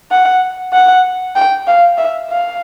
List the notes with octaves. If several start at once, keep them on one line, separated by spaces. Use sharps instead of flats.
F#5
F#5
G5
F5
E5
F5